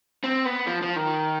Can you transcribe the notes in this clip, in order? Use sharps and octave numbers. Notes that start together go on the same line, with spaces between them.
C4
B3
F3
F3
D#3